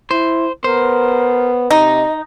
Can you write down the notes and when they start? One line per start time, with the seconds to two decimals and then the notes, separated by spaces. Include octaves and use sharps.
0.11 E4 C5
0.64 B3 A#4 C5
1.71 C3 D#4 D#5